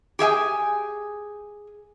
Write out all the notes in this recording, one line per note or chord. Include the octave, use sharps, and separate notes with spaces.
G4 G#4 E5 G#5